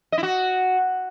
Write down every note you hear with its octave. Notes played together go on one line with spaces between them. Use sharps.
D#5
E4
F#4